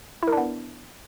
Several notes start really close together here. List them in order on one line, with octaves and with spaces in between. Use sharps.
E4 A#4 D4 B3